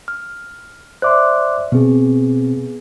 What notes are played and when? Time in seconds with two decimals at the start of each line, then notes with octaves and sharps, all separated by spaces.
0.08 F6
1.02 C5 D5 E5 C6 D6 F#6
1.72 B2 B3 C4 G#4